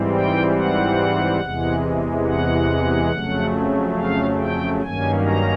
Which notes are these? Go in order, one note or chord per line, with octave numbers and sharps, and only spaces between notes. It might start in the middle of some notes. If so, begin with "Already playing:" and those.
Already playing: G#2 E3 G3 C4
G5
F#5
E2 C3 E3 G#3
F#5
F2 C#3 F#3 A3
F5
G5
G2 D#3 F#3 A#3 C#4 G#5
A#5